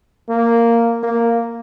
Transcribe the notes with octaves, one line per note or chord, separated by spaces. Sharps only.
A#3
A#3